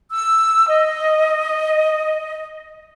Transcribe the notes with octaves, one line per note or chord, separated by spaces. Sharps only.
E6
D#5